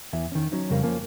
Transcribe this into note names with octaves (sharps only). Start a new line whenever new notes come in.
E2 E3 E5
D#3 C#4
F#3 C#4 D#4
F2 C#3 G3 A#4 F5
F3 A#3 C#4